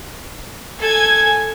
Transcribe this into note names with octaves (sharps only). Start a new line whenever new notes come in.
A4 G#5 G#6